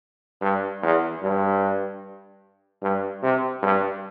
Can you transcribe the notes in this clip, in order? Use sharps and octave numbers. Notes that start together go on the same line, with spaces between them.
G2
E2
G2
G2
C3
G2